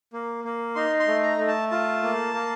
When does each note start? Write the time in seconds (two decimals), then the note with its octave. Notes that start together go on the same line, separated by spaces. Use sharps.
0.13 A#3
0.44 A#3
0.75 D#4 C6
1.00 C6
1.08 A3
1.23 A#5
1.39 A3
1.48 A5
1.71 F4 A5
2.03 A#3
2.34 A#3